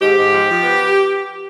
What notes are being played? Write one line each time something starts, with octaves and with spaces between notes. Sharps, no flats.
G#2 G4
G#2
F3
F3
B3